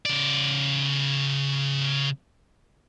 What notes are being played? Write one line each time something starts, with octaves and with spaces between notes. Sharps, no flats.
C#3 D5